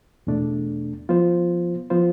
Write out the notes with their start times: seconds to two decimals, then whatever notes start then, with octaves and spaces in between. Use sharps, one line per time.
0.27 E2 B2 A3 D4
1.09 F3 B3 F4 C5
1.90 F3 B3 F4 C5